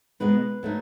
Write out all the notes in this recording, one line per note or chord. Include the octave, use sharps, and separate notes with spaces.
B2 G#3 B3 D#4 B4
F#3 A3 D#4